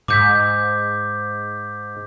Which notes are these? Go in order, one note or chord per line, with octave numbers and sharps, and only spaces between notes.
G#2 D6 G6 B6